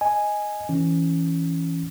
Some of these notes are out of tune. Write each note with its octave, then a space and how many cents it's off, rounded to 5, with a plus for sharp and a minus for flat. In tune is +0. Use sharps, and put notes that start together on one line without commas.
D#5 +0 G#5 +0
E3 +0 C#4 +0